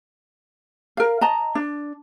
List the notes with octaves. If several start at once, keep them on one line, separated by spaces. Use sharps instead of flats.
A#4 F5
D#5 A5 A#5
D4